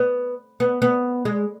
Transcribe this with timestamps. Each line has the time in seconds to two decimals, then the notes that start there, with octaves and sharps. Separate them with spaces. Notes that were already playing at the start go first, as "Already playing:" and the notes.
Already playing: B3
0.60 B3
0.82 B3
1.25 G#3